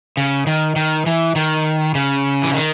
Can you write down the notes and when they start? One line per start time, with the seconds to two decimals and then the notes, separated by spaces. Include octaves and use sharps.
0.17 C#3
0.47 D#3
0.76 D#3
1.06 E3
1.36 D#3
1.95 C#3
2.43 E3
2.54 D#3